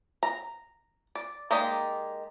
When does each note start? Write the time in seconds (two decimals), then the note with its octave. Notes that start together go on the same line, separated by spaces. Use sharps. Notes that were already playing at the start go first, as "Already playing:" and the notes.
0.23 A#5
1.15 D5
1.51 G#3 A#3 D#4 G4 D5